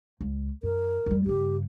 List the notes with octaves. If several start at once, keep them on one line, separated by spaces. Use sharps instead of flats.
C#2
F#2 A#4
F2 G3
G2 C#3 G4